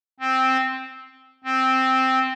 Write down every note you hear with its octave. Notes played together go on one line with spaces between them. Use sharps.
C4
C4